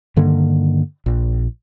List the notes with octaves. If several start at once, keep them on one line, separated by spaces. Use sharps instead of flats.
G2 D3 D#3 A#3
A#1